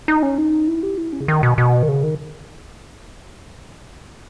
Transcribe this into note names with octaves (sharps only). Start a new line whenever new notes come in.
D#4
C#4
D#4
E4
G4
E4
C#4
C#3
D#3
B2
B2
D#3
C#3
D#3